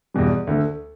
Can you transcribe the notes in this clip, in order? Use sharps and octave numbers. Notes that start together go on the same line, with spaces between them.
E2 B2 G3
D2 D3 A3